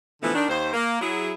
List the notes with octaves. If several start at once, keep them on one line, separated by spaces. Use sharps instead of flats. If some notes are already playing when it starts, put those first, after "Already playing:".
B2 D3 E3 F3 A3 B3
D#3 D4
D#2 C5
A#3
F#3 E4 G#4